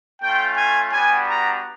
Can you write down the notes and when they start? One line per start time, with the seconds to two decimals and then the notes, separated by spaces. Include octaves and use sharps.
0.22 A3 C#4 F4 G5
0.57 G#5
0.93 G3 B3 D4 F#4 G#5
1.29 A#5